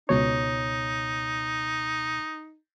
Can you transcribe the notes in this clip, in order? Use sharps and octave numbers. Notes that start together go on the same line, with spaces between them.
C#2 B2 D#4 C#5